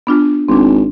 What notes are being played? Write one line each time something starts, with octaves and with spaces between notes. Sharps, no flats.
B3 D4 F4
G#1 C4 D4